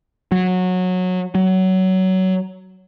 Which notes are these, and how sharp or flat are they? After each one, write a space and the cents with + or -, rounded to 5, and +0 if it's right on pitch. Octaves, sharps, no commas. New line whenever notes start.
F#3 -20
F#3 +20